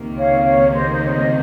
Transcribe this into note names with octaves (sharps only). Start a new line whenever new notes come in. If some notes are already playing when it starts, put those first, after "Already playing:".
Already playing: C#2 C3 D#3 A#3
C#5 F5
C#5 F5
C5 D#5
C5 D#5
C#5
C5 D#5